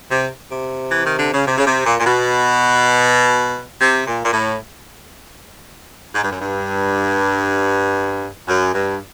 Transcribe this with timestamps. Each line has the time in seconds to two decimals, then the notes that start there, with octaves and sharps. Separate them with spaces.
0.11 C3
0.50 C3
0.91 E3
1.06 D#3
1.19 D3
1.34 C#3
1.47 C3
1.58 C#3
1.66 C3
1.86 A#2
2.00 A#2
2.06 B2
3.81 C3
4.07 A#2
4.25 A#2
4.33 A2
6.15 G#2
6.24 G2
6.32 F#2
6.41 G2
8.48 F#2
8.74 G2